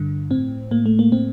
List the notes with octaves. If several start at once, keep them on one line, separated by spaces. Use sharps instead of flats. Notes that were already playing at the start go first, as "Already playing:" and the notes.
Already playing: G2 D3
A2 C4
A2 A#3
A3
A#3
A2 C4